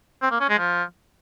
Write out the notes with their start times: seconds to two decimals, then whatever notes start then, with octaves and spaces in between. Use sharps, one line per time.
0.22 C4
0.31 A#3
0.40 C#4
0.49 G#3
0.58 F3